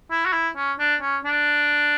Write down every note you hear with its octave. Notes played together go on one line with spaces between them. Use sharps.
E4
F#4
E4
C#4
D4
C#4
D4